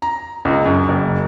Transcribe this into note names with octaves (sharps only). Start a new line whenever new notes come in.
A#5
C#2
F#2
F#1